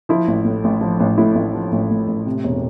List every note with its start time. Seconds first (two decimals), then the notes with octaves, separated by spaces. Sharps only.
0.09 F3 E4
0.28 A1
0.45 A2
0.64 A1
0.81 F3
1.00 A1
1.18 A2 E4
1.35 A1
1.54 F3
1.72 A1
1.90 A2
2.08 A1
2.26 C3
2.44 E1